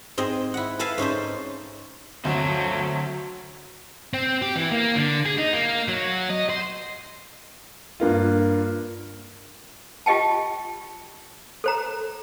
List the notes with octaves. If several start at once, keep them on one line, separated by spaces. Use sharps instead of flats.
G#2 C4 G#4 D#5
E4 F#5
A4 B4 E5 F5 G#5 B5
G#2 C#4 D#4 C5
D2 F#3 C4 A4
C4
G4
E3
A#3
D3
G#4
D#4
A#3
F#3
D#5
C5
G2 A#3 F4
F4 G4 D#5 G5 A5
A4 C5 A#5